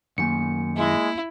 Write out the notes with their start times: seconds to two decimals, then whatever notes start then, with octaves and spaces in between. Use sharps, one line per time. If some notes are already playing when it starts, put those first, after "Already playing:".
0.18 F#2 D#3 A#3 G#5 C#7
0.77 G#3 E4